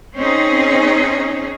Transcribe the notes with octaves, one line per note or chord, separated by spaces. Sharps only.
C4 C#4 D#4 G#4